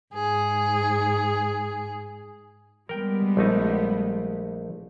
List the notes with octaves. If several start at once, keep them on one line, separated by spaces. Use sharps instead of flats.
G#2 G#4
G3 G#3 B3 A#4 G5
A#1 A3 D#4